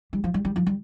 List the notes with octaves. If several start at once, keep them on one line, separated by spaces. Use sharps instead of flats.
G3
F3
G3
G3
F3
G3